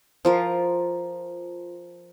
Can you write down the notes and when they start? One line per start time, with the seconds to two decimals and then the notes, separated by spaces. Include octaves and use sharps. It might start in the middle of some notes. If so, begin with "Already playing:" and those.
0.25 F3 F4 A#4